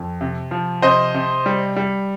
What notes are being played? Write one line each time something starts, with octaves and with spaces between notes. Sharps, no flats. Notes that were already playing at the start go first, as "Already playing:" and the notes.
Already playing: F2
C3
F3
C3 C5 D#5
C3
G3
G3